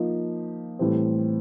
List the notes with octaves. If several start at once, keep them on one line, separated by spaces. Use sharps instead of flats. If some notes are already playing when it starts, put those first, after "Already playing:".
Already playing: F3 A#3 D#4
A2 E3 G3 C4